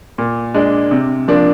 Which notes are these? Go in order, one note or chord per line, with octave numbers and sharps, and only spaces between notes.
A#2
G#3 D4
C3
F3 A#3 D4